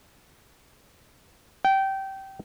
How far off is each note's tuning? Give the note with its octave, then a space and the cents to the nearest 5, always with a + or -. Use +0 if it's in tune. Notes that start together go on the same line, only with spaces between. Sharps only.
G5 -20